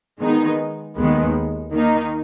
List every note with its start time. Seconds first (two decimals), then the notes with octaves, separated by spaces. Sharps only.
0.21 D#3 G#3 B3 D#4
0.96 D#2 D#3 G#3 B3
1.73 D#3 A#3 D#4